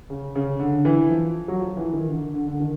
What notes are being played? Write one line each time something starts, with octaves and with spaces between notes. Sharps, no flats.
C#3
C#3
D3
E3
F3
F#3
F3
E3
D#3
D3
D3
D3
D#3